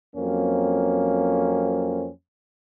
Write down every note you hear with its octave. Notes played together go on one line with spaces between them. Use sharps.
F2 F#3 A#3 C4 C#4